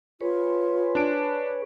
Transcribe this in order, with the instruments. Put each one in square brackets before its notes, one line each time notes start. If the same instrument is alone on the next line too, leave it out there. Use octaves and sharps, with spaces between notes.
[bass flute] F4 [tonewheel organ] G#4 B4 C#5
[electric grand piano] D4 D7